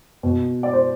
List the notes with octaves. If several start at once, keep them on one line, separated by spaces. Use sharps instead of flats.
B2
D5
C5